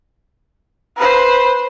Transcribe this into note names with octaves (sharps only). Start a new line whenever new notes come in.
B4 C5